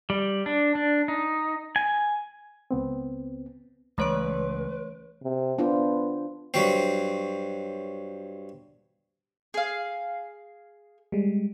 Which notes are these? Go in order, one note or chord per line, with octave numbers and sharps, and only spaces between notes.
G3
D4
D4
D#4
G#5
C#2 B3 C4
C#2 E3 A3 B4 C#5 C6 C#6 D7
C3
B3 D4 F4 C5
G2 F#3 C4
G#4 F5
G3 G#3